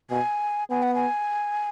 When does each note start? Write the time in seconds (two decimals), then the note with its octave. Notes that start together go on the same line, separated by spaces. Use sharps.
0.11 B2 G#5
0.70 B3 G#5
0.83 F#5
0.95 G#5